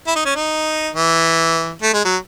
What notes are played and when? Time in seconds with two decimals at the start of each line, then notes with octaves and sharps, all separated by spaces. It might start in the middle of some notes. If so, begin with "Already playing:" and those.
0.07 E4
0.16 D#4
0.25 C#4
0.35 D#4
0.95 E3
1.82 A3
1.94 G#3
2.05 F#3